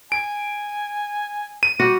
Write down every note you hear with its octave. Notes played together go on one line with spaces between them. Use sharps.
G#5 D7
D#7
G3 F#4